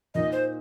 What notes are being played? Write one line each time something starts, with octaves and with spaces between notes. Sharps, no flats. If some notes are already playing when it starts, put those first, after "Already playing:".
A#2 A#3 D#4 D#5
C5